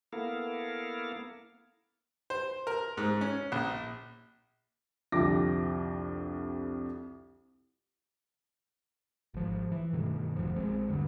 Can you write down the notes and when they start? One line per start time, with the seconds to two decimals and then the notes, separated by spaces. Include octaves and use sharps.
0.13 A#3 B3 E4 A4 A#4 F5
2.30 C5
2.67 A#4
2.97 G#2
3.21 C#4
3.52 A#1
5.12 C2 F2 D3 G4 D6 A#6
9.34 G#1 F3
9.72 E3
9.93 G2 B2 D#3 A3
10.36 F1 D2 F3
10.56 A#1 G#3 C4
10.89 E2 G2 D3